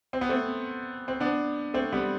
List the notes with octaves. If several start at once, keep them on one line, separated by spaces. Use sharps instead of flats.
C4
B3
A3 C4
C4
B3 D4
A3 C4
G3 B3